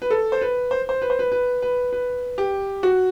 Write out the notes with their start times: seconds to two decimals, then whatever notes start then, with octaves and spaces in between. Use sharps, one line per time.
0.02 B4
0.11 A4
0.32 C5
0.41 B4
0.71 C5
0.89 C5
1.02 B4
1.10 C5
1.19 B4
1.32 B4
1.62 B4
1.93 B4
2.38 G4
2.83 F#4